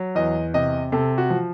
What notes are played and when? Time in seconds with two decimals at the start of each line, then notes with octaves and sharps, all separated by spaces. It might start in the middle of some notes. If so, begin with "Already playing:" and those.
Already playing: F#3
0.15 E2 D#5
0.54 C3 D#5
0.92 C3 A4
1.18 F#4
1.30 F3